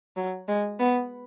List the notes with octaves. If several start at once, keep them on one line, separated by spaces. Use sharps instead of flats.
F#3
G#3
B3